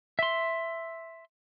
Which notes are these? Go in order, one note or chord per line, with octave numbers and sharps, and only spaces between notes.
E5 C6